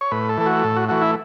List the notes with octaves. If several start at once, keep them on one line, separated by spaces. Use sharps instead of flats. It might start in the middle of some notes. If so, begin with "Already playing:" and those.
C#5
A2 B4
A4
E3 A3
F#4
A2 A4
F#4
E3 A3 F#4
E4